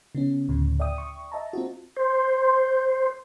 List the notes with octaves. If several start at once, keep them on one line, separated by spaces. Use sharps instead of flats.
C#3 B3 C#4
D2 A2 C#3
D5 E5 G5 D#6
C#6
D#5 E5 A5 A#5
C4 F4 F#4
C5